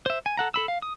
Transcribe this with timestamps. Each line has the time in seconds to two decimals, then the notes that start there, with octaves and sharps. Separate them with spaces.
0.06 C5 E5
0.26 G#5
0.37 A4 F#5 A#5
0.54 A4 B5 E6
0.68 F5
0.82 D#6